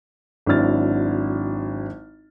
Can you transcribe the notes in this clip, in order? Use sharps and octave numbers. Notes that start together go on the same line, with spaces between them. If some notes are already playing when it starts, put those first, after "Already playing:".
G#1 F#3 D4 E4 F6 A6